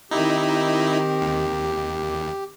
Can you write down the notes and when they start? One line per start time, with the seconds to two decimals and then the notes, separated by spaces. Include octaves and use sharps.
0.11 D#3 C4 D#4 E4 G4 A#4
1.21 D#2